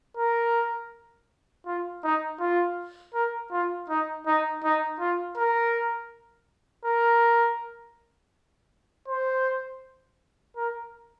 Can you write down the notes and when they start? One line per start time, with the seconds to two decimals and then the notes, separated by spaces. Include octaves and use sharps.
0.17 A#4
1.66 F4
2.03 D#4
2.40 F4
3.14 A#4
3.51 F4
3.89 D#4
4.26 D#4
4.63 D#4
5.00 F4
5.37 A#4
6.85 A#4
9.08 C5
10.57 A#4